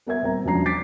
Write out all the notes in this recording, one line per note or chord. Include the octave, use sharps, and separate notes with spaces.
B3 A#4 E5 G#6
D#1 C4 A#5
E1 F#2 F3 D4 A#5 C7
D6 A6 B6 C7 D7